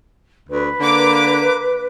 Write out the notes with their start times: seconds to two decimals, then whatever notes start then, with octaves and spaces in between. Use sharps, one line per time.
0.49 D2 B4
0.80 D3 A#3 D6